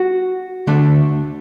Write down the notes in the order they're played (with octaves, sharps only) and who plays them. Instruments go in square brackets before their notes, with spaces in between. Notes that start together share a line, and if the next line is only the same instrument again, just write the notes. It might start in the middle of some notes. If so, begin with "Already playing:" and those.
Already playing: [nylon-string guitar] F#4
[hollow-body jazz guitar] D3 A3 D4 A4 E5